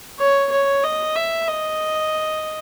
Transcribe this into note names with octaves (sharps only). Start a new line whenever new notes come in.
C#5
C#5
D#5
E5
D#5